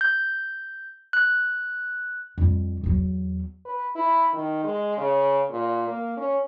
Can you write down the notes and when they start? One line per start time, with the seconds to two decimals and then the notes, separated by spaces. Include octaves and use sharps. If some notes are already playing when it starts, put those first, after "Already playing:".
0.01 G6
1.13 F#6
2.38 F2 G3
2.84 E2 F#3
3.65 B4
3.95 E4
4.33 D#3
4.64 G#3
4.97 C#3
5.50 A#2
5.88 A#3
6.17 C#4